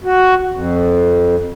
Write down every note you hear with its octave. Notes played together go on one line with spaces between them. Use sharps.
F#4
F2